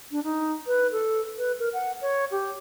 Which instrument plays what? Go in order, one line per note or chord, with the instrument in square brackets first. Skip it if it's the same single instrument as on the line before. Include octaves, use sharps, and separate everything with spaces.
[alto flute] D4
D#4
B4
A4
B4
A#4
F#5
C#5
G4